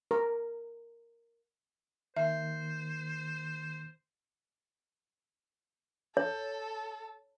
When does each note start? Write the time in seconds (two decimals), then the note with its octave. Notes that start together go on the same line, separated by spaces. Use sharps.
0.11 A#4
2.17 D#3 A#3 C5 E5
6.17 A4 C#5